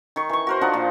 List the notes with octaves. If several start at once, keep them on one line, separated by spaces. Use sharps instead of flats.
D#3 C#6
E3 C#6
F#4 A#4 C5
F3 D4 D#4 F#5
A#2